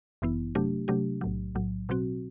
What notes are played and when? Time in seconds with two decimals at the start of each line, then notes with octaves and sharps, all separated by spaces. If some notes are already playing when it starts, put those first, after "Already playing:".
0.22 G1 F#2 E3 B3 E4
0.55 C3 F#3 A3 D4 G4
0.88 C3 F#3 A3 D4 G4
1.21 B1 A2 F#3
1.55 B1 A2 F#3
1.89 B2 F#3 C4 F#4